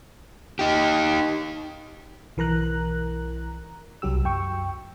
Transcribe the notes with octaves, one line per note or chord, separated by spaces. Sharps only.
D#4 G4
B1 E3 A#4 A#5 F#6
C2 F#3 G4 E6
F#2 G5 C#6